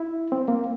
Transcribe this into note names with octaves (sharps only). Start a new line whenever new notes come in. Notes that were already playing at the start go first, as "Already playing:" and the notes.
Already playing: E4
C4
A#3